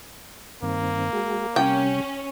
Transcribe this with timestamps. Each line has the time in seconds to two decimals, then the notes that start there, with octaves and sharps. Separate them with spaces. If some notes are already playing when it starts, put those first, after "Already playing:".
0.62 G2 D#3 A#3 C4
1.13 G#3 F#4 G#4
1.56 C3 G3 C#4 G5